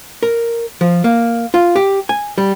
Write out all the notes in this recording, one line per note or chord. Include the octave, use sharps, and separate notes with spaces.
A#4
F3
A#3
F4
G4
G#5
G3